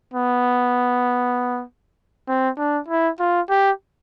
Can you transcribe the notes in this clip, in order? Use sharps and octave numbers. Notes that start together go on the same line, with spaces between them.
B3
C4
D4
E4
F4
G4